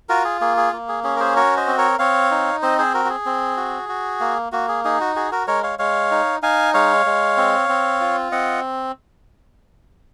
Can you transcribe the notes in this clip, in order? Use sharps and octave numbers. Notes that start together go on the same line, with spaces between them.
F4 F#4 A#4
G#4
A#3 G#4
G#4
A#3
G#4
C#4 G#4
A#4
G#4 C5
F#4 A#4 C#5
C5 D#5
C4
A#4 C#5
C4 C#5 F5
D#4
C4 C5 D#5
G#4 C5
F#4 A#4
F#4
G#4
C4
F#4
F#4
A#3
A#3 F#4
G#4
D#4 G#4
F#4
F#4 G#4
F#4 A#4
G#3 A#4 C#5
C#5 F5
G#3 C#5 F5
D#4
D#4 F5 G#5
G#3 C#5 F5
G#3
C4
C4
F4
C4 D#5 F#5